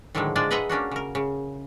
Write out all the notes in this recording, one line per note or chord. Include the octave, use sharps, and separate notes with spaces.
A2 D3 D#3 F3 F#3 G#3
G#3 D4 F4 C5 D5 D#5
G#4 B4 D#5 E5 F#5 A#5
A#3 C#4 D4 F#4
C#3 A#4
C#3